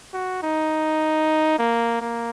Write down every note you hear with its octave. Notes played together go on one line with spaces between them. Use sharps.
F#4
D#4
A#3
A#3